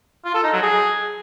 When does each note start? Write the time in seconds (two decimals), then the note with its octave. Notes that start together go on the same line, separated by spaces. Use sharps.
0.25 F4
0.34 A4
0.43 D#4
0.53 F#3
0.62 G#4